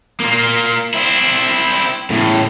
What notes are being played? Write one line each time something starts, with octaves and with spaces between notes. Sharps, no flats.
A#3 F4
C4 E4
A2 C#3